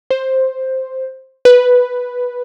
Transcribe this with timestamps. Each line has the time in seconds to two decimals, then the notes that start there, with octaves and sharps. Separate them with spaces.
0.10 C5
1.45 B4